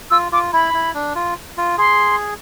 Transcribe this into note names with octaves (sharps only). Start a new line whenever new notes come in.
F4 E6
F4 D6
E4 B5
E4
D4
F4
F4
G#4 C6